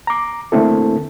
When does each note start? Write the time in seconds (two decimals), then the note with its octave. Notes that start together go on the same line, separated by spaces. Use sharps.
0.07 A#5 D6
0.52 D3 A3 A#3 C4 E4 A4